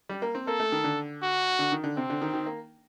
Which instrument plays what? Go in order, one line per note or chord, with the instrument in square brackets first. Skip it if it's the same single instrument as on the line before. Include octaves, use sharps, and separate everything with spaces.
[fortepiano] G3
A#3
C4
[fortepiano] A#3 [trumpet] A4
[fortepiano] A3
D#3
D3
[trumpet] F#4
[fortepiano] D3
D#3
D3
[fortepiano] C3 [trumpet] C4
[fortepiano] D3
D#3
D#3
A#3